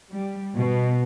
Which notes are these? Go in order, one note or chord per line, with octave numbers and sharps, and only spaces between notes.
G3
B2